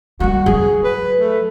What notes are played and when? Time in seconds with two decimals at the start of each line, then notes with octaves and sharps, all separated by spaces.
0.20 G3 A#3 F#4
0.46 F#3 G#4
0.84 B4
1.20 A3